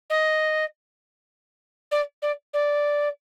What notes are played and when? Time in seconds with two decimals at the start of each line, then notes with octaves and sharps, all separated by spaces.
0.10 D#5
1.91 D5
2.22 D5
2.54 D5